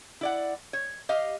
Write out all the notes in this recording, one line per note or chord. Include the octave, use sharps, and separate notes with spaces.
E4 D5 F#5
C#5
G4 D#5 F5